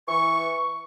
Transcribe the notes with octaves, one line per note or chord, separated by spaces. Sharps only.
E3 C#6